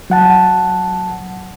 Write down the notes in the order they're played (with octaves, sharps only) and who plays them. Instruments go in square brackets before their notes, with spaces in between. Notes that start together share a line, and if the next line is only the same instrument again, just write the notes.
[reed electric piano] F#3 F#5 A5